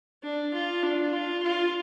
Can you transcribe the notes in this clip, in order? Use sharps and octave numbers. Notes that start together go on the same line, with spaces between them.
D4
F4
D4
F4
F4